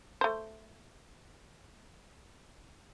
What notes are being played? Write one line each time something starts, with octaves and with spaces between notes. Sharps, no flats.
A3 C5